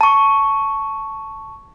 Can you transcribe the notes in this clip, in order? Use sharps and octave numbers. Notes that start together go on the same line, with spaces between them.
A5 C#6